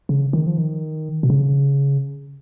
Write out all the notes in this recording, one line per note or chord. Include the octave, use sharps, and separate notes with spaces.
C#3
D#3
F3
D#3
B2
C#3